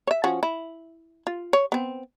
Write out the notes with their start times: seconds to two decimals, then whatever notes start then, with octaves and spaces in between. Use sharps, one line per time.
0.07 C#5 E5
0.24 F3 C#4 F#4
0.43 E4
1.27 F4
1.53 C#5
1.72 B3 C4